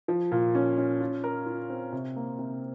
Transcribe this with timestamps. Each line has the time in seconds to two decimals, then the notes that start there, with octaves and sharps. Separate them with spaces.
0.08 F3
0.32 A#2
0.55 C#4
0.78 C#4
1.00 F4
1.24 A#4
1.46 F4
1.70 C4
1.92 C3
2.16 A#3
2.38 C3